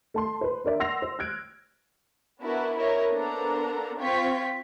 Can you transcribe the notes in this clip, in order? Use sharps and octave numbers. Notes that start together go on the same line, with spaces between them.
A3 A5 C6
B4 C5
D4 A#4 D5 E5
F#5 C6 E6 A#6 C7 F7
C5
F6 F#6 G#6 D7
B3 D4 E4 F#4 A#4 B4
E4 A#4 C#5 D#5
A#3 B3 D4 A4 C5 A#5
C4 F4 G5 C#6 G#6 B6